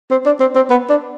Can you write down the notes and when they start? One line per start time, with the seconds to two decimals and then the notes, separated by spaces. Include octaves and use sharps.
0.11 C4
0.26 D4
0.40 C4
0.55 C4
0.70 B3
0.89 D4